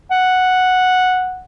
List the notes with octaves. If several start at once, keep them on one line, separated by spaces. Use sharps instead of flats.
F#5